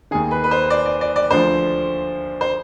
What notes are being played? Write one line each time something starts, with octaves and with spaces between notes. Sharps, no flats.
D#2 D#3 G#4
B4
B4
C5
D5
D5
D5
D5
D2 D3 F3 C5
C5